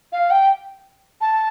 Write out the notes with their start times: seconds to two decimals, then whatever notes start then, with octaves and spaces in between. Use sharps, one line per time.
0.13 F5
0.31 G5
1.21 A5